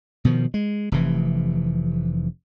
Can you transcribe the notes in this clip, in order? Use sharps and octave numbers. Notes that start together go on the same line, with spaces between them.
B2 D#3 F3
G#3
F1 C3 E3